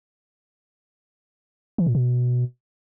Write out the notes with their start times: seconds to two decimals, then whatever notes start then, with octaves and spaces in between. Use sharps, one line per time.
1.78 E3
1.87 A#2
1.95 B2